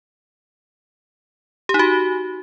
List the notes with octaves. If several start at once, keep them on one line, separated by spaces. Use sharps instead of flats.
G4
D#4
F#4